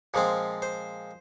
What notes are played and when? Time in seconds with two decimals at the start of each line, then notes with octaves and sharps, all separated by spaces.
0.14 A#2 F3 G#3 C4
0.62 C5